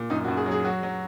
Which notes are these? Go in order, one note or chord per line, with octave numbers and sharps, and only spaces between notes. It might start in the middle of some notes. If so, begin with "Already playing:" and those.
Already playing: A#2
F#2 D#4
F#4
F#2
G#4
F#3
G#4
F#3 F#4
F#3